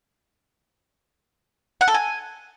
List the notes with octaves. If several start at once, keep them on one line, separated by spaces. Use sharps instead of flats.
F#5
A4
G#5